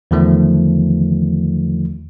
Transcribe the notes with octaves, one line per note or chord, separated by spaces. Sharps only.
E2 D3 D#3 F3 A3